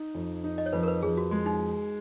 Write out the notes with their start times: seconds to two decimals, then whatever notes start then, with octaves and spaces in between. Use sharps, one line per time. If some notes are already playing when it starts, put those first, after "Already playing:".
Already playing: D#4
0.15 F2
0.44 D#4
0.58 D#5
0.66 C#5
0.73 F2 B4
0.83 A#4
0.88 B4
1.03 F2 G#4
1.17 F#4
1.31 G#3
1.46 D#4